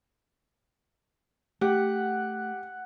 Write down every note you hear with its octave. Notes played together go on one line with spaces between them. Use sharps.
A3 G4 F#5